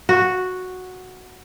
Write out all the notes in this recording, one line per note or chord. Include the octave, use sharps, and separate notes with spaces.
F#4